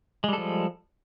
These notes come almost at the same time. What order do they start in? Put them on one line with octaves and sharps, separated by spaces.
G#3 G3 A4 F3